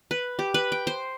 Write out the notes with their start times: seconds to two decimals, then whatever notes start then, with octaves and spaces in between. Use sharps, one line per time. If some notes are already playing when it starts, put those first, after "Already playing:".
0.11 B4
0.39 G4
0.54 B4
0.72 G5
0.87 C5